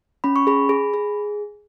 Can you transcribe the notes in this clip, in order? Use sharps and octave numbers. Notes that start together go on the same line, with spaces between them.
C#4 B5
C#6
G#4 B5
G#4
G#4